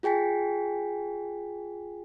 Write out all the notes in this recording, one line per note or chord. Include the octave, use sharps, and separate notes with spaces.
F4 G#4 G5 G#5 B6